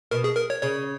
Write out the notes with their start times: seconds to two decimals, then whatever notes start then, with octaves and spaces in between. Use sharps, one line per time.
0.11 B2 A#4
0.24 G#4
0.37 A#4
0.50 C#5
0.62 C#3 C#5